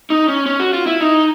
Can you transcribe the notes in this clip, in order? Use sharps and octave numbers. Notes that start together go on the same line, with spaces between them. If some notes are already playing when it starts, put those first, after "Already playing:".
D#4
C#4
C#4
F#4
F4
E4
D#4